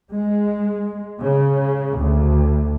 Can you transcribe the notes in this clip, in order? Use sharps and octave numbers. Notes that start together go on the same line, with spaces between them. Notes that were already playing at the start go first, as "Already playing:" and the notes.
G#3
C#3
D2